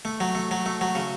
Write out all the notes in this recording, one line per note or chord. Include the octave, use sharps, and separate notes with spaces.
A3
F#3
A3
F#3
A3
F#3
C#3